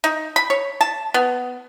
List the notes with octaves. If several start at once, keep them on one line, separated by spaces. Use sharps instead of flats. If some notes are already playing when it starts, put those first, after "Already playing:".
D#4
B5
C#5
A5
B3